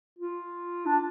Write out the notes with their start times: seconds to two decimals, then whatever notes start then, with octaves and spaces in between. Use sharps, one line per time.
0.19 F4
0.86 D4